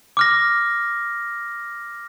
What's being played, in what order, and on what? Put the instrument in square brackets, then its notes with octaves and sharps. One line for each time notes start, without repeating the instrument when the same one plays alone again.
[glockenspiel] D6 F6 A#6